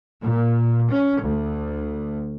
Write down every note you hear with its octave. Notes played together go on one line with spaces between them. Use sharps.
A#2
C#4
D2